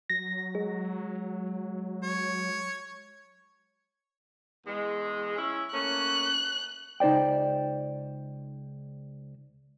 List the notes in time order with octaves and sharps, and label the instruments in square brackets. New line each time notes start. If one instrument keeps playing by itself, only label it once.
[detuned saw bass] F#3 [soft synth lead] A#6
[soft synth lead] G#3
[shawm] C#5
[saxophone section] E2 G#3
C#4 E4
[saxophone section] A3 A#3 C#4 [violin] F#6
[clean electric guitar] C#2 D#4 C5 D5 G5